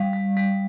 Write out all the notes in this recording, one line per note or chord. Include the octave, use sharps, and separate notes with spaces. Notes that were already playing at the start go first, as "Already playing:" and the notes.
Already playing: G3 F5
G3
G3